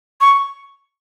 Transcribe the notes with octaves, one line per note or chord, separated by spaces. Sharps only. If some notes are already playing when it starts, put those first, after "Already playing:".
C#6